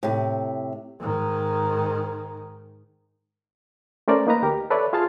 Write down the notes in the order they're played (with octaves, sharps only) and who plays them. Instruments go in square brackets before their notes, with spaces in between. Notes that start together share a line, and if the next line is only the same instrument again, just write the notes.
[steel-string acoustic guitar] A2 C3
[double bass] G#2 D#3
[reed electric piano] A3 C#4 A#4 C5 D5
A#3 D#4 B4 A#5
D2 G4 A#4
A4 B4 C#5 D5 E5
F4 G#4 F5 A5 C6 F6